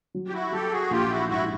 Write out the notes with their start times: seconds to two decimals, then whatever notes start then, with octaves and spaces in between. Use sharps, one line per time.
0.14 F#3
0.28 G4
0.33 E4 F#4
0.52 F#3 G4 A4
0.72 F#4 G#4
0.90 A#1 F4 G4
1.10 E4 F#4
1.29 G#2 E4 F#4